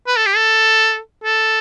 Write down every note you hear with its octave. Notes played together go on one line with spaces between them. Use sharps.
B4
A4
G4
A4
A4